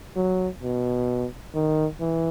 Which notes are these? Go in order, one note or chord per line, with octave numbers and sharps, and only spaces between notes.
F#3
B2
D#3
E3